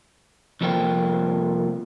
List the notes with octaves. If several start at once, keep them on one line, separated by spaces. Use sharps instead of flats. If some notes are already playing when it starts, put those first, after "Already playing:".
C2 F2 F3 A#3 F4 G5